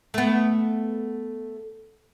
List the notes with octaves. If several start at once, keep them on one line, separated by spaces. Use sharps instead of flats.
A3 B3